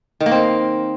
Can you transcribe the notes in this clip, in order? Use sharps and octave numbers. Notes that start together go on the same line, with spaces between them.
D#3
A#3
C4